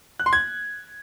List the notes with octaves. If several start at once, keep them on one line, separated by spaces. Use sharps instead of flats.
F#6
C6
G#6